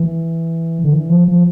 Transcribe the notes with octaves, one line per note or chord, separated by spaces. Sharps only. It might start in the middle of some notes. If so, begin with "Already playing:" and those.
Already playing: E3
D3
E3
F3
F3